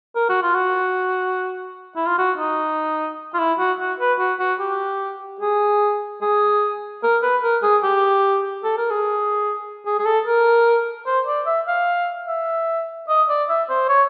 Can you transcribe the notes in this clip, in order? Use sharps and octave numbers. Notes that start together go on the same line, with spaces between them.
A#4
F#4
F4
F#4
E4
F4
F#4
D#4
F4
E4
F#4
F#4
B4
F#4
F#4
G4
G#4
G#4
A#4
B4
A#4
G#4
G4
A4
A#4
G#4
G#4
G#4
A4
A#4
C5
D5
E5
F5
E5
D#5
D5
E5
C5
C#5